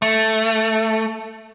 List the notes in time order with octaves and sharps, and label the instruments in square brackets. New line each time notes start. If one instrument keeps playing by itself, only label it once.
[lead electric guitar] A3